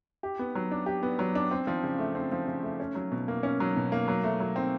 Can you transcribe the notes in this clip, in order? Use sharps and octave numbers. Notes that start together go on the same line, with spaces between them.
G4
B3
F#3
D4
G4
B3
F#3
D4
C4
F3
C#3
A3
C4
F3
C#3
A3
C#4
F#3
B2
A#3
C#4
F#3
B2
A#3
F#3
A3
F#3
C4